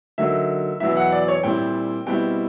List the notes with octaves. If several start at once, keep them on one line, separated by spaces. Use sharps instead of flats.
D3 F#3 A#3 D#4 E5
E2 B2 F#3 B3 E4 E5
F#5
D5
C#5
A#2 G3 C4 E4 G5
B2 G3 C4 E4 G5